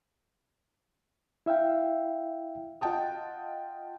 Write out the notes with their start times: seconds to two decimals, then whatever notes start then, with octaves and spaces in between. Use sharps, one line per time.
1.46 E4 E5 F5 G5
2.81 F4 D#5 F#5 G5 A5 D#6